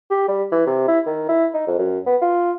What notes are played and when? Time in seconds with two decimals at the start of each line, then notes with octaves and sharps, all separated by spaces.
0.10 G4
0.28 G3
0.52 E3
0.66 C3
0.88 E4
1.06 D#3
1.29 E4
1.53 D#4
1.67 F2
1.78 F#2
2.06 B3
2.22 F4